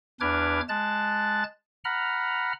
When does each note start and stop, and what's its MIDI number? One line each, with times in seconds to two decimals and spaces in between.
0.21 0.61 40
0.21 0.61 62
0.21 0.61 71
0.21 0.61 86
0.21 0.61 89
0.21 0.61 92
0.69 1.44 56
0.69 1.44 81
0.69 1.44 90
0.69 1.44 93
1.85 2.53 78
1.85 2.53 82
1.85 2.53 83
1.85 2.53 89